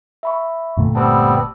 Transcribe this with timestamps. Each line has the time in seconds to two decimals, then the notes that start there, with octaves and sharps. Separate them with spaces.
0.23 E5 B5 C#6
0.77 G1 A#2 A3
0.95 G3 B3 C4 A5 D6 E6